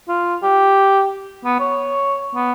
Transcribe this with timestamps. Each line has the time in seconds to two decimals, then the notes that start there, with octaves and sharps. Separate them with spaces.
0.09 F4
0.43 G4
1.45 B3
1.60 C#5
2.34 B3